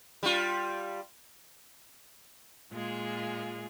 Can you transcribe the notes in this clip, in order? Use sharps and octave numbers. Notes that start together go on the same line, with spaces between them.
G3 F4
A#2 G#3 F4 G#4